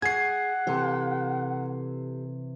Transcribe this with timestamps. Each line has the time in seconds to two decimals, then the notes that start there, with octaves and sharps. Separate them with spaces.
0.02 G#4 F#5 G#6 C7
0.67 C3 E3 G4 A4